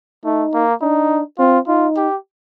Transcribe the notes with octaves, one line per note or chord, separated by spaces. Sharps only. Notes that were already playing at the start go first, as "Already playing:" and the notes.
A3 D#4
A#3
D4 D#4
C4 F4
D#4 F4
G4